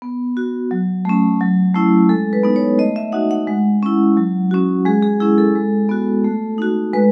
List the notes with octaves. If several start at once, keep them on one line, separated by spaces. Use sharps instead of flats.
B3
F#4
F#3
A3 C#4
F#3
A3 C#4 E4
G#3 A4
B4
B3 D#4
C#5
A3 D#5
E5
D#4 F#4 F#5
F#5
G#3
C#4 E4
F#3
C#4 F#4
G#3 G#4
G#4
C#4 E4 G#4
A4
G#3
B3 F#4
A3
D#4 F#4
G#3 B4